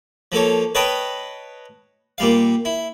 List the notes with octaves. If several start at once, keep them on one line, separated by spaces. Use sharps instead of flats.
F3 A#3 A4 C#5
B4 C#5 D#5 G5 A5 B5
A#2 G3 F5
E4